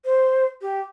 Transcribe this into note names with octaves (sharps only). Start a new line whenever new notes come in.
C5
G4